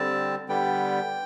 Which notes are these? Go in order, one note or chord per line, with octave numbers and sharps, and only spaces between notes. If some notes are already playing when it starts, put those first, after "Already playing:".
Already playing: D3 G3 C4 A5
D3 G3 B3 G5